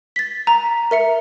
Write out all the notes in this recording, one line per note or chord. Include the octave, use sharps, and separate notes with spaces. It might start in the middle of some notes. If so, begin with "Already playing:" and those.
A6 B6
A#5
A#4 E5 C#7